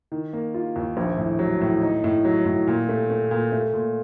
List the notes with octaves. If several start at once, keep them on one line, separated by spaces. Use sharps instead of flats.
D#3
A#3
F4
D#2
A#1
A2
F#3
A2
D#4
A2
F#3
A2
A#2
A3
A3
A#2
A3
A#2